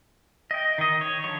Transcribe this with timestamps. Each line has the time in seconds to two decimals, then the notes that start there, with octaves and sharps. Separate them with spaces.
0.51 D#5 G5
0.78 D#3 D#5
1.01 C#5
1.24 D3 F3 C#5